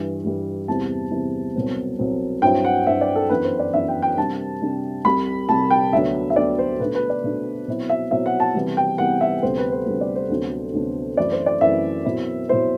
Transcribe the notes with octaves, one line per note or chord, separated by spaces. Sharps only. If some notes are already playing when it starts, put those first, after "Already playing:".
Already playing: G2 E3 G3
G2 E3 G3
E2 C3 G3 C4 E4 A5
E2 C3 G3 C4 E4
C2 B2 F#3 C4
C2 B2 F#3 C4
G2 F#3 C4 E4 G5
F#5
G2 F#3 C4 E4 E5
D5
A4
F#2 E3 B3 D4 B4
C5
D5
F#2 E3 B3 D4 E5
G5
G5
C3 G3 D4 A5
C3 G3 D4
C2 C3 G3 B5
C2 C3 G3 A5
G5
D2 D3 F#3 B3 D4 E5
E5
D2 D3 F#3 B3 D4 D5
C5
B2 A3 D4 B4
B4
D5
B2 A3 D4
B2 F#3 C4 E4
E5
B2 F#3 C4 E4 E5
F#5
A5
C3 E3 G3 B3
G5
C3 E3 G3 B3 F#5
E5
D2 C3 G3 B3 C5
B4
C5
D2 C3 G3 B3
D5
C5
D2 C3 F#3 B3 D4
D2 C3 F#3 B3 D4
F#2 E3 A3 C4 E4 D5
C5
D5
F#2 E3 A3 C4 E4 E5
B2 F#3 C4 E4
B2 F#3 C4 E4 C5